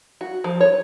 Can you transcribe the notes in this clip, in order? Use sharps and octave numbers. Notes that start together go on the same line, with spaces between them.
F#4
F3
C#5